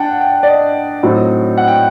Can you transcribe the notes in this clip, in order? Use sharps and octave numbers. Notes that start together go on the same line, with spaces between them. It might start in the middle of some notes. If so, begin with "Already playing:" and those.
Already playing: D4 F#5 G5 A5
G5
D5
D#5
A2 F#3 C4 D#4
F#5
G5